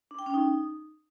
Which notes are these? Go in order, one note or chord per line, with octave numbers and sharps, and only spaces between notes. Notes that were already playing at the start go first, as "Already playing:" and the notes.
D4
G5
C#4
D#4